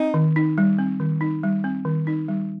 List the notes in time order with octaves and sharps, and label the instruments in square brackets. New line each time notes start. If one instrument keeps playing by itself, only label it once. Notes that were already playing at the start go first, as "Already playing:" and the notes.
Already playing: [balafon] C4 [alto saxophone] D#4
[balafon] D#3
D#4
G3
C4
D#3
D#4
G3
C4
D#3
D#4
G3